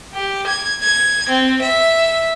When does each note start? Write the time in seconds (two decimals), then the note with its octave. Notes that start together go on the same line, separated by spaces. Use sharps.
0.14 G4
0.47 G#6
0.82 G#6
1.29 C4
1.62 E5